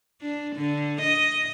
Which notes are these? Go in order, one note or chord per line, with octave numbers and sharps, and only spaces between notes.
D4
D3
D#5